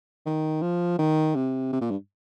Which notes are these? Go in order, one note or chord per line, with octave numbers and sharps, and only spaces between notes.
D#3
F3
D#3
C3
C3
A#2
G2